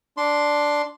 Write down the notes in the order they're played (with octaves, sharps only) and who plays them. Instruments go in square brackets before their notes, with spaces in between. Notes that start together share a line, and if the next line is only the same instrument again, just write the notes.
[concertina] D4 C6